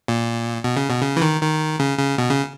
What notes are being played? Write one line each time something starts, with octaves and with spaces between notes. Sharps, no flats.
A#2
B2
C#3
B2
C#3
E3
D#3
D#3
C#3
C#3
B2
C#3